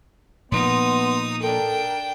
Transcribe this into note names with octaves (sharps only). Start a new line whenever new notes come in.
A#2 F3 A#3 B3 D#4 C6 D#6
D4 A4 A#4 G5